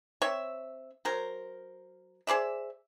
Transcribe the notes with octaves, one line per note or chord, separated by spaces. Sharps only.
C4 C#5 E5
F#3 A#4 C5
G#4 C5 D5 E5